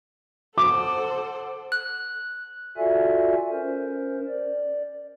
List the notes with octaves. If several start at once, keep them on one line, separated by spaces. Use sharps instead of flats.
A4 C5 F#5 D6
F#6
F4 F#4 A4 D5 E5 G#5
C#4 A#4 C5
D5